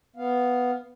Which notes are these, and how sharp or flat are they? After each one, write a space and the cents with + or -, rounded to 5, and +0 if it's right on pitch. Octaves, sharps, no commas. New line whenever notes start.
B3 +0 F5 +0